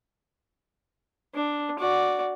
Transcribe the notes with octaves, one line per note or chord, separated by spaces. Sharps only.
D4
F#4 D5